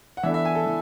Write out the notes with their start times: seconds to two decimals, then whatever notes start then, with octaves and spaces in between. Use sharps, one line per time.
0.17 F#5
0.23 E3 B3 D4 A4 E5
0.34 E5
0.45 G#5
0.55 A4
0.66 E3